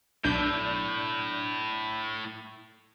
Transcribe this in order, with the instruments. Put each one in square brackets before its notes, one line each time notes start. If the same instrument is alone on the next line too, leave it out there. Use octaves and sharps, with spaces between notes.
[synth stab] B1 D4 G6 [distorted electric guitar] A2